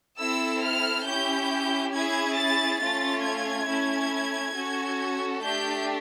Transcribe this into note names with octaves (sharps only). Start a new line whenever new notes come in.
C4 E4 A4 E6
F6
C#4 E4 G4 G6
C#4 E4 G#4 G#6
A6
A3 C#4 F4 A6
G#6
A3 C#4 E4
C#4 F#4 A4
A3 D4 G4 G6